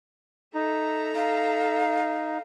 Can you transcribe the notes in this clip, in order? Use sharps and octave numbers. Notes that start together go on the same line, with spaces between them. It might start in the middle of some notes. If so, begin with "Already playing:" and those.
D#4 A4 E5 A#5
D#4 F5